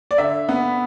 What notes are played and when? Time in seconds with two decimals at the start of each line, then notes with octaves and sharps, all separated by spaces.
0.11 D5
0.18 D3 E5
0.49 B3